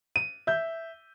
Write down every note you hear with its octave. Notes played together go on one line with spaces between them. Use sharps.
D#7
E5 G6